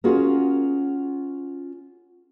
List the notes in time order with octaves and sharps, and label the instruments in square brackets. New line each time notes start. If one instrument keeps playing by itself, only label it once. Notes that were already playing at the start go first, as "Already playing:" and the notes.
[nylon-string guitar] C#4 F4 F#4 G#4 A#4